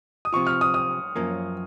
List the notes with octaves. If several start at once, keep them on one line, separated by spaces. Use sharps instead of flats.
D#6
C3 F3 C4 F4 C#6
F6
D#6
D#6
F#2 F3 A#3 C#4